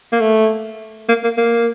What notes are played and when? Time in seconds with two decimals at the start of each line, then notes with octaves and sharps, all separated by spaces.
0.12 A#3
0.21 A3
1.09 A#3
1.24 A#3
1.37 A#3